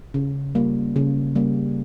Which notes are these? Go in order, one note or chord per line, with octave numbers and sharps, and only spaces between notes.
C#3
G3 A#3
C#3
G3 A#3